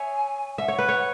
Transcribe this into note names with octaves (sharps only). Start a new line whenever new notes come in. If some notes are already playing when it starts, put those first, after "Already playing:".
Already playing: C#5 E5 G#5
E5 F#5
C#5
B4
C#5